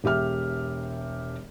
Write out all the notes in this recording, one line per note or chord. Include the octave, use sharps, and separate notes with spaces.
E1 G4 E5 F6